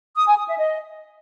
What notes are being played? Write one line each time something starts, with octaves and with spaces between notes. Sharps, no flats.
D#6
G#5
D#6
E5
D#5